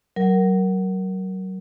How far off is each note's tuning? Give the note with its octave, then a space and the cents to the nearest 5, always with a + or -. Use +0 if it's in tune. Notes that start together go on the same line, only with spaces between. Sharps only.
F#3 +30 A#4 +0